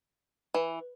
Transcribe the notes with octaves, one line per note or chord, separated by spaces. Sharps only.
E3